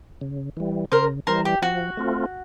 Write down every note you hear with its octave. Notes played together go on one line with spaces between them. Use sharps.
C#3
E3 G3
C#3 A#4 C5
E3 G3 A#4 C5
G4
F3 F#4
A3 C4 F4